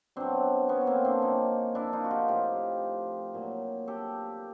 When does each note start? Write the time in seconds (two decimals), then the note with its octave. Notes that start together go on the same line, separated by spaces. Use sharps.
0.16 B2 F#3 C4 D4
0.69 B3 C#4
0.81 B3
0.87 A#3 C4
1.05 C4 D4
1.22 A#2 F3 C#4 D#4
1.75 D4 E4
1.93 D#4 F4
2.04 F#4
2.11 F4 G4
2.28 A2 F3 F4 G4
3.34 A#2 F#3
3.88 G4 A4